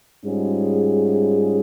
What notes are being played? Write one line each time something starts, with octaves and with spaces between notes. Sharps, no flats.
G#2 G3 C#4 F4 G#4